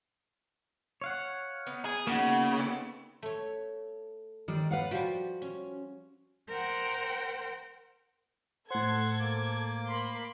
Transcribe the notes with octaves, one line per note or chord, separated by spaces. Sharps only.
C#5 F5 F#5
B3 D#4
G#4
C#3 A#3 B3 D#4 F#4 F#5
B3 C4 A4
A3 C#5
D#3 G3 D5
B4 F5 F#5
F3 G3 F#4
C#4
A#4 C5 F#5 G5
A2 A4 C5 F#5 C6 G#6
A#3 D6
A#4 B5 C6